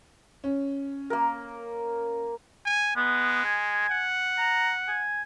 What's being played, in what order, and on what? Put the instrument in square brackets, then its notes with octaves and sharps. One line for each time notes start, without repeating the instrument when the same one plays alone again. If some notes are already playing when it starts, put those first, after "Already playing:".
[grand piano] C#4
[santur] A#3 A#4
[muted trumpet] G#5
[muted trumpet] G#3 [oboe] B3
[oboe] G#5
[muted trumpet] F#5
[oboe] A#5
G#5